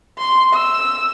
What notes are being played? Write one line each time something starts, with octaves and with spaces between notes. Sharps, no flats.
C6
E6